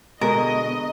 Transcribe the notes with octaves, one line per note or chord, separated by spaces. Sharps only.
B2 D3 G#3 A#4 D#5